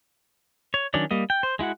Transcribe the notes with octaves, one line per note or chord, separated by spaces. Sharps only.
C#5
D#3 F#3 C#4 D4 D5
G3 A#3 D#5
G5
C5
G#3 E4 F#4 F#5